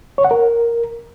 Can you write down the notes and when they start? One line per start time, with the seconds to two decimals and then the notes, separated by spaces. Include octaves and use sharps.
0.18 C#5
0.25 F#5
0.31 A#4